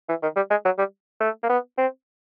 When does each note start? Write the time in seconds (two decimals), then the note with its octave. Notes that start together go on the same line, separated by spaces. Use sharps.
0.09 E3
0.23 D#3
0.36 G3
0.51 G#3
0.65 F#3
0.78 G3
1.21 A3
1.43 A#3
1.50 B3
1.78 C4